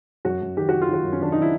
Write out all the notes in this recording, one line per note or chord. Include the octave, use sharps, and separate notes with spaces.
F#2 F#4
F#2
D#3 G4
D#3 F#4
F4
D#3 F#4
F#2
C#4
D#3 D4
D#3 D#4
E4